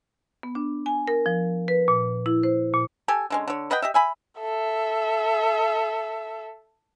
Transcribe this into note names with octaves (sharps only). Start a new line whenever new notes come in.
B3
D4
G#5
A#4
F3
B4
A#2
E4
C5
A#2
G4 A4 G#5
D3 G#3 C#4
D3 C#5
B4 D#5 F#5 G5
G4 D#5 E5
E5 G#5 B5
A4 E5